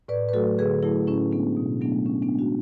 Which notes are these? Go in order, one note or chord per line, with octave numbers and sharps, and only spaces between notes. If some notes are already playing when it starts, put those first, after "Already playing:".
A2 B4 D5
B4
F#3 A3 F#4 A4
D3 G#4 B4
F#3 A3 E4 G#4
A2 C#4 E4
G#3 B3 D4
B2
F#3 A3 B3 D4
B2 C#4
B3 D4
G#3
D4 F#4